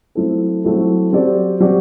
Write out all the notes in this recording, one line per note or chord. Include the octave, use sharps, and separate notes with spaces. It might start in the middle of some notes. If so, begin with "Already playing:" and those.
F#3 A3 C4 E4 A4
F#3 A3 C4 E4 A4
F#3 C4 G4 D5
F#3 C4 G4 D5